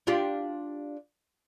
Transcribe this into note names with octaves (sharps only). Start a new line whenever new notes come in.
D4 F4 G4